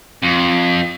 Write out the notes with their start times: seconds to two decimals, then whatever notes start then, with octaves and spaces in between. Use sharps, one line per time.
0.23 F2